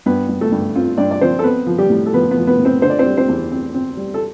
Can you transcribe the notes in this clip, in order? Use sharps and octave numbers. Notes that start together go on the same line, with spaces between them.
G2 B3 B4
G2
A3 A4
G2
C4 F4
G2 D4 D5
D5
F3 C4 C5
A4
B3 C4 B4
F3
G3 G4
A2
A4
F3 B3 B4
B3 B4
F3
B3 B4
A2
C4 C5
D3 C5
D5
C4 C5
G3
C4 C5
E2
C4
C4
G3
A4